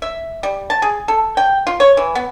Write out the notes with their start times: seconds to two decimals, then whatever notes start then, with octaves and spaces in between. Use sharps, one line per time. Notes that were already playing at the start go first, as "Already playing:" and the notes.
0.02 E5
0.43 G3
0.70 A5
0.82 G#4
1.08 A4
1.37 G5
1.67 F4
1.80 C#5
1.97 E3
2.15 B3